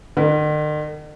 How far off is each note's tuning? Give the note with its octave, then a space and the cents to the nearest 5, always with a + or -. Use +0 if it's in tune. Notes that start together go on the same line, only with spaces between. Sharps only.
D#3 -45 B4 +0